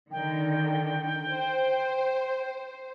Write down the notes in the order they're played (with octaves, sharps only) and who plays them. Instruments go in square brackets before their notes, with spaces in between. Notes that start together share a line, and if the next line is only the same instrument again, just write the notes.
[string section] D3 D#3 [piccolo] G5
[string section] C5